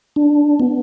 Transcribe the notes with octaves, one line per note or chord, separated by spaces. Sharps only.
D4
B3